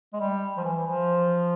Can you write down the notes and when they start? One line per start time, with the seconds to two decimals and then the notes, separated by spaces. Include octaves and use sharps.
0.13 G#3
0.20 G3
0.57 F3
0.64 E3
0.87 F3